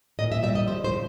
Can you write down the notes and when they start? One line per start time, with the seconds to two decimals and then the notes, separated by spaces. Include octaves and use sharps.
0.19 A#2 D#5
0.32 E5
0.43 G3 E5
0.55 D#5
0.68 F3 C5
0.84 C5
0.91 C#3